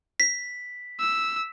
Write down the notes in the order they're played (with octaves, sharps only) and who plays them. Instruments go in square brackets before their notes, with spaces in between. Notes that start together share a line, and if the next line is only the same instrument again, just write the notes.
[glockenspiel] B6
[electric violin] E6